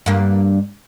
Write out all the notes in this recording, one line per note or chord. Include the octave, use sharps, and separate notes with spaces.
G2 A#3